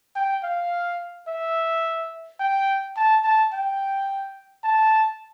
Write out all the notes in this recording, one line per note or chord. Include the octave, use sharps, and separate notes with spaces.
G5
F5
E5
G5
A5
A5
G5
A5